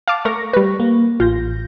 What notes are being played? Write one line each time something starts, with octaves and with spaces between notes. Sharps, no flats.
F5 A5 D6
A3 A#4 C#6 A#6
G3 B4
A#3
A1 F4 G6 A#6